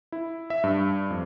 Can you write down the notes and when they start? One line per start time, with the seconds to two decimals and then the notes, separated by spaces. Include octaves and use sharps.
0.12 E4
0.50 E5
0.64 G2
1.10 F2